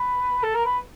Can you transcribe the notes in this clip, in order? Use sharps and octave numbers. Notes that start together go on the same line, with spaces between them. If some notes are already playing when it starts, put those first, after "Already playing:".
Already playing: B4
A4
A#4
B4